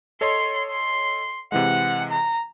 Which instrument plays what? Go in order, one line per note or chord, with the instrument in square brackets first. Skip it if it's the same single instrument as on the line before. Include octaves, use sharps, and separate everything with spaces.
[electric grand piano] A4 C#5 D#5 [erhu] C6
[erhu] C6
[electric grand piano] C3 E3 G#3 [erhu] F#5
[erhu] A#5